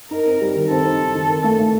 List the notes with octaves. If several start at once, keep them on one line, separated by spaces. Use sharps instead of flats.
D#4 A#4
C4
G3
D#3
C4 A4
D#4
D#4
D#3
A#4
A3
A3